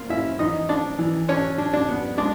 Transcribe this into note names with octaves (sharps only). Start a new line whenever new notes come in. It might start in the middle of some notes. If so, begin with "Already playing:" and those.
Already playing: A#3 F4 F5
C#4 E4 E5
E3 D#4 D#5
D4 D5
E3
C#4 D4 C#5
D4
D4 D5
B3
G#3 D4 D5